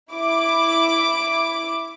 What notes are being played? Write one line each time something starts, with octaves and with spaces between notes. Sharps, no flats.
E4 D6